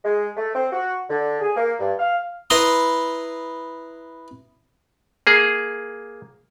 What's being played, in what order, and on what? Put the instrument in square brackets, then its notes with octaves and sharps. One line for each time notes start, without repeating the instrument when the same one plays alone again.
[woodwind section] G#3
A3
C4
F#4
D3
G#4
A#3
G2
F5
[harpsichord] E4 B4 A#5 C6 D#6
[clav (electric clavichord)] A#3 G#4